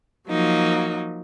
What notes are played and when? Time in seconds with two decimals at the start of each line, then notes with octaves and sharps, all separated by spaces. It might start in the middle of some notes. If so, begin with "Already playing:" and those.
0.28 F3 F#3 A#3 D#4